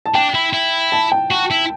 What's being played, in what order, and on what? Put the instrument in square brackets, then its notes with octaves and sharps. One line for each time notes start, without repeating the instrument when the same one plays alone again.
[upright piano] A5
[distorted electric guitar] D4 [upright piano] G5
[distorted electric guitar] E4
E4
[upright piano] A5
G5
[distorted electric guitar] F#4
E4